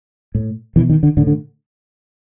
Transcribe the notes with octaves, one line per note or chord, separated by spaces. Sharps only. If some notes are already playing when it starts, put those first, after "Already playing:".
A2
B2 E3
D#3
D3
A2 D3
D3